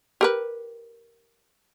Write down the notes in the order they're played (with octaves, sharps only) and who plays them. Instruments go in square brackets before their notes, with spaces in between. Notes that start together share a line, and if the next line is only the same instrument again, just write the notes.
[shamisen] G4 A#4 B4